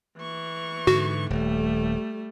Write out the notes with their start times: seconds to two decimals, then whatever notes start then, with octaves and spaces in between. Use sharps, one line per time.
0.17 E3 C#6
0.87 G#2 D3 F#4
1.30 D#1 G3 A3